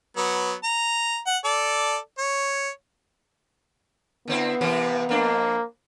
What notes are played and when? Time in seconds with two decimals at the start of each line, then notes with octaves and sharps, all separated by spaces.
0.17 F#3 B3
0.64 A#5
1.27 F#5
1.45 A4 D5
2.18 C#5
4.28 D3 B3 C4 E4
4.61 C3 E3 A#3
5.09 F2 A#3 D4